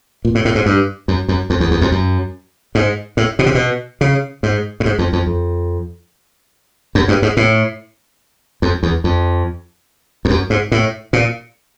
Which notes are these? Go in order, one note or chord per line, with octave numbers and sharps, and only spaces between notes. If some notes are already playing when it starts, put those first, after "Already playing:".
A#2
A2
A2
G#2
G2
F#2
F#2
F2
E2
E2
F2
F#2
G#2
A2
B2
C3
B2
C#3
G#2
A2
G#2
F2
F2
F2
F#2
G2
G#2
A2
F2
E2
F2
F2
F#2
G#2
A2
A#2